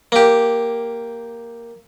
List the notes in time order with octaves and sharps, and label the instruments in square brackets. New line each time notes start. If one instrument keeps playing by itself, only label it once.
[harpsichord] A#3 G4